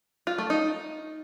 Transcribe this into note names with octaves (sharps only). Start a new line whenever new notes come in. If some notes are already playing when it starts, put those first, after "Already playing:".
F4
A3
D#4